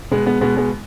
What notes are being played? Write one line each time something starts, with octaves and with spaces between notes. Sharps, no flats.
B2 G#3 B3
G#3 B3
B2 G#3 B3
G#3 B3